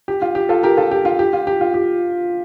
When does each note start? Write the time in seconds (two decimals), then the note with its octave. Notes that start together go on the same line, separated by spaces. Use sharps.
0.08 G4
0.22 F4
0.35 G4
0.49 F4 A4
0.63 G4 A#4
0.77 F4 A4
0.91 G4
1.05 F4
1.19 G4
1.33 F4
1.47 G4
1.61 F4
1.74 G4